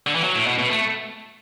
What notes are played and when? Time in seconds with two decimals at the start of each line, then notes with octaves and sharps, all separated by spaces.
0.07 D3
0.15 E3
0.23 F#3
0.35 A2
0.47 B2
0.59 B2
0.69 A3